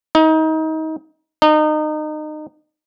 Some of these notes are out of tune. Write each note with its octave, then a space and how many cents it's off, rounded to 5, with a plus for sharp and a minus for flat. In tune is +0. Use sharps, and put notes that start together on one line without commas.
D#4 +30
D#4 -25